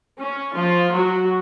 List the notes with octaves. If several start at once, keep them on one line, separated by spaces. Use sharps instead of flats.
C#4
F3 F4
F#3 F#4